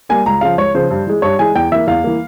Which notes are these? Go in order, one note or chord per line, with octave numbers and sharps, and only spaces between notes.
G3 A#3 G#5
C#2 A#5
C#3 F3 F5
C#2 C#5
C#3 F3 C5
G2
E3 G#3
G2 C#5
E3 G#3 G#5
E2 G5
E3 A#3 E5
E2 F5
E3 A#3